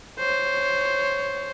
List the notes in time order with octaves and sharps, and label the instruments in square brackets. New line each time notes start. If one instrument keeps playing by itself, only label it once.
[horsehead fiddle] C5 C#5